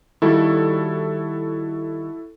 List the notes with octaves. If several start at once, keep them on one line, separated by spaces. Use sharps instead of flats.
D#3 G3 E4 F#4 A4